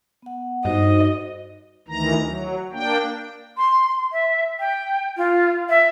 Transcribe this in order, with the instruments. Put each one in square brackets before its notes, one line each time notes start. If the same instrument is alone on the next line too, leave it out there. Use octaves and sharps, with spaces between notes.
[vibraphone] B3 F#5
[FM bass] G2 [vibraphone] D#4 F#4 C5 [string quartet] D#5
[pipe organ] D2 D#3 E3 A#5
F#3
A#3 D4 G5
[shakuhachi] C6
E5
G5
F4
E5